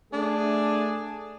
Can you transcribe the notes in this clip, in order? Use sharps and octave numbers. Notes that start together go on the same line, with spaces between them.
A3 D4 G#4